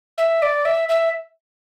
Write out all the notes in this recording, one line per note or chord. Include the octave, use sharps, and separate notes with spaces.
E5
D5
E5
E5